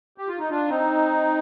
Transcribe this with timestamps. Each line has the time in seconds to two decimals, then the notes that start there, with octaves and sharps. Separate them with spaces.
0.18 G4
0.28 F4
0.39 D#4
0.50 D4 F4
0.69 C4 D#4